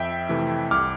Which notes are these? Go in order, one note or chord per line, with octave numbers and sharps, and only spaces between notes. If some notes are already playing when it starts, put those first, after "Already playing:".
Already playing: F2 E5 G5
C3 E3 A3
C2 D6 F6